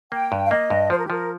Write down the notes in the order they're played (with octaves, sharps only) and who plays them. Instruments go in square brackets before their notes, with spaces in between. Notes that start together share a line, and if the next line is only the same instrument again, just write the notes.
[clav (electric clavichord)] A#3 [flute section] G5
[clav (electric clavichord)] G2
[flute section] F5
[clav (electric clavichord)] A#3 [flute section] D#5
[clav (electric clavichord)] G2
[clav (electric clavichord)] F3 [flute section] C5
[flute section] A#4
G4
[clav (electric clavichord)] F3 [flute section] A#4